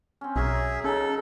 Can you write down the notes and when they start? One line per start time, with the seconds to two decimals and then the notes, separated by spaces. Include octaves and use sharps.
0.21 C4 C#4
0.36 B1 F#3 G#4 A#4 C#5 E5
0.84 C#3 C#4 D#4 A4 A#4